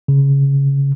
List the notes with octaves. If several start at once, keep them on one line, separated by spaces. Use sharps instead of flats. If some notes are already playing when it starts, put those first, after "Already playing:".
C#3